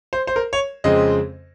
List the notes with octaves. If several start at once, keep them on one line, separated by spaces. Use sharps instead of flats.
C5
C5
A#4
C#5
F2 C#3 G#3 C4 D#5